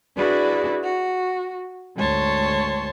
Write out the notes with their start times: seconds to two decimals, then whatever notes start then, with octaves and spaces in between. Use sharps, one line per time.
0.17 D4 E4 F#4 G#4 B4 D5
0.82 F#4
1.97 D2 G#2 C#5 A5 C6